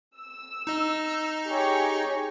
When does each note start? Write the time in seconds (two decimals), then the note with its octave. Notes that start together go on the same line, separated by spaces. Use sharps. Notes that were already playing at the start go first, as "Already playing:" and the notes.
0.18 E6
0.67 D#4 D#5
1.46 G4 G#4 C#5